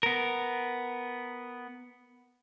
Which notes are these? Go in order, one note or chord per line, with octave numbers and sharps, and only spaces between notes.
B3 A#4